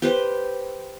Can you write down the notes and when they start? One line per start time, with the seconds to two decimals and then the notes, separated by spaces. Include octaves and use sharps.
0.02 G4 B4 C5